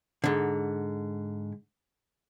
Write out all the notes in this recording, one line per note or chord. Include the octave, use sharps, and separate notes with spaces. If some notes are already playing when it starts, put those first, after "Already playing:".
G#2 D3